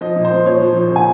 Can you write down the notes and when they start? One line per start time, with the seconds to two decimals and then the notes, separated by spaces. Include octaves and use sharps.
0.01 F3 D#5
0.16 A#2
0.25 C5
0.32 A#2
0.46 F3 C#5
0.62 F3
0.76 A#2
0.91 C#3 G#5